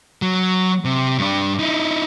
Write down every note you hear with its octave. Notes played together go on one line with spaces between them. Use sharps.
F#3
C3
G2 D4
D#4 E4